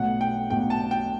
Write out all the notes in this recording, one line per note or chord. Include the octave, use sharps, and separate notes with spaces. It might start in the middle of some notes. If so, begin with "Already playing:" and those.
Already playing: B1 B2 A3 F#5
G5
B1 B2 A3 G5
A5
G5